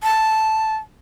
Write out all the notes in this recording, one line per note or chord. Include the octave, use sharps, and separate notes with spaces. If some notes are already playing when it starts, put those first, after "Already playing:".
A5